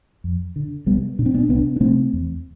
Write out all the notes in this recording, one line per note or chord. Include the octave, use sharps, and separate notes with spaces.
F2
D3
C2 G3 B3
B2 D4
C4
B3 D4
C2 B3 D4
D4
C3 A3 C4
E2